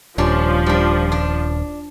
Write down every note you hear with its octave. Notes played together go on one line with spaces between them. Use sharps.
D#1 F3 G3 C#4 D4
G3 D4
D4